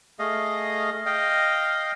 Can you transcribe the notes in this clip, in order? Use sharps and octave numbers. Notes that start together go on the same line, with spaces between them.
A3 G#4 D#5 F5
D#5 F5 G5